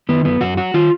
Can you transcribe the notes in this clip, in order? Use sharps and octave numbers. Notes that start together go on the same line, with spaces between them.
D#3 B3
F#2 B3
F#2 F#4
F#3 F#4
D#3 F4